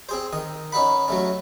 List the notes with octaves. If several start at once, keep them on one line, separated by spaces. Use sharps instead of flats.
C4 G#4 C5
D#3 D#6
C#4 D#4 B4 F#5 B5
F#3 A3 C#4